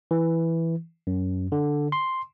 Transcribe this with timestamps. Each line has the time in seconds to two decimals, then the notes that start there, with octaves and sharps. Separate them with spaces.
0.11 E3
1.07 F#2
1.52 D3
1.92 C6